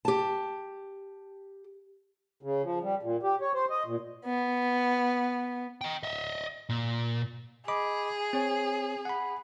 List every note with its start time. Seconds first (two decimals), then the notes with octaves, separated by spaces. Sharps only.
0.05 G4 A5
2.43 C#3
2.63 F3
2.82 G3
3.03 A#2
3.23 G4
3.41 C#5
3.54 C5
3.70 D#5
3.86 A#2
4.24 B3
5.81 D#5 G5
6.03 D#5 E5
6.69 A#2
7.68 G#4 D#5 B5 D6
8.33 C4 C#5
9.05 F#5 B5